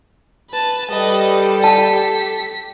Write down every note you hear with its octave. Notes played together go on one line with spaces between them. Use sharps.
B4 A5
G3 G4 A4 B4 D#5
A5 B6